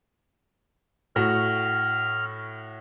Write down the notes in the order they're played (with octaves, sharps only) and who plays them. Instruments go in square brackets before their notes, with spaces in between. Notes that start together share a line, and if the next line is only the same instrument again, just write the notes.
[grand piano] A2 F#4 [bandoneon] F6